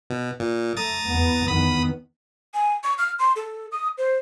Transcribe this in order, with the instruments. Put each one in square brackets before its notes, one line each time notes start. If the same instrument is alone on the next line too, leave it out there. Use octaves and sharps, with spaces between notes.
[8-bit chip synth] B2
A#2
[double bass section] A3 [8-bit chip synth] A#5 D#6 A6
[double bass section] E2 B3
[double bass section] E2 D#3 B3 [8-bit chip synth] B5 D#6
[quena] G#5
C#6
F6
C6
A4
D#6
C5